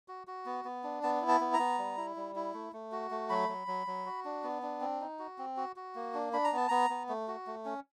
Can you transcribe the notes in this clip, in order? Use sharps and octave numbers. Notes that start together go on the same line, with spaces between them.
F#4
F#4
B3
B3
D4
B3 A5
E4
A5
B3
A#5
B3
G3
E4
G3
E4
A3
A3
F#4
A3
F#3 B5
F#3
F#3
F#3
F#4
D4
B3
D4
C4
D#4
F#4
C4
F#4
F#4
A#3
D4
D4 B5
A#5
B3 A5
B3 A#5
B3
A3
F#4
A3
C#4